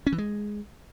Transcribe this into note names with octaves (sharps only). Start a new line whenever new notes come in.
C#4
E3
G#3